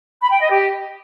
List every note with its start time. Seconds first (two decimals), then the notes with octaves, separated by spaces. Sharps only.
0.22 B5
0.31 G5
0.41 D#5
0.50 G4